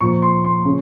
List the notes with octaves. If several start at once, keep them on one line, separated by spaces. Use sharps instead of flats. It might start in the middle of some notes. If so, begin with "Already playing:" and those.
A#2 F3 A#3 C#6
C6
C6
C#3